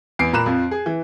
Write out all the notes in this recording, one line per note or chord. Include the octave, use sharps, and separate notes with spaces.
E2 C7 D7
A#2 A#5 B5 F#6 E7
F2 F3
G#4
E3